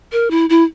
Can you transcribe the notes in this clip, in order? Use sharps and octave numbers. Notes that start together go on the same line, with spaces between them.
A#4
E4
E4